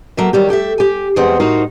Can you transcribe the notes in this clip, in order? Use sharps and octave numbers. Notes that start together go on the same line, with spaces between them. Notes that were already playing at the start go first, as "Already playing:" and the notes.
F#3 A3 A#3 E5
D#3 F#3 G3 G4
A3 G4 A4 E5
G4 G#5
E2 G#3 C4 G#4 F#5
A2 D#4 F#4 A#4 C5